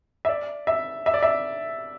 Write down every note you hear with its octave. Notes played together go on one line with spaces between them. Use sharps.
E5
D5
E5
E5
D5
E5